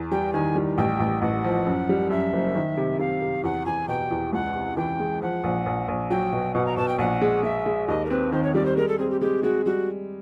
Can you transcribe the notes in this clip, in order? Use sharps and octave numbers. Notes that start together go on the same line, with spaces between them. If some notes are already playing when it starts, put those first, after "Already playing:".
Already playing: E2
G3 G5
D#3 G#5
G3
A1 G5
A1
A1 F#5
F3
F#2
G3
F#2 E5
F#1
D#3
C3
C3 F5
C3
E2 F#5
E2 G#5
B2 G5
E2
C#2 F#5
C3
E3 G5
G#3
F3 F#5
A#1
A#1
A#1
F#3 G5
B2
B2 F#5
A#5
B2 A5
G5
A#1 F#5
G#3
G#3 E5
G#3
D#2 D#5
A#4
C4 B4
D#3 C5
C#5
G3 D5
C5
G#3 A#4
A4
C4 G#4
G4
G#3 G4
G#3 F#4
G3 F#4